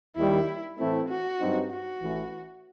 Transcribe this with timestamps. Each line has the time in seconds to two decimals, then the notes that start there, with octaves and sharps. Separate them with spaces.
0.16 D#2 D#3 G3 E4
0.78 A2 E3 A3 C4 E4
1.09 F#4
1.40 G2 F#3 C4 D#4
1.71 F#4
2.01 A1 A2 E3